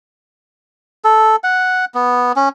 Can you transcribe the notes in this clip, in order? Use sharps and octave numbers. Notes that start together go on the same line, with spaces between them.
A4
F#5
B3
C#4